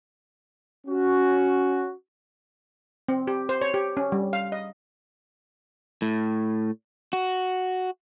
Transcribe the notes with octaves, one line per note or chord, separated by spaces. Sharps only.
C#4 F#4
C4
G4
C5
C#5
G4
C#4
G3
F5
D#5
A2
F#4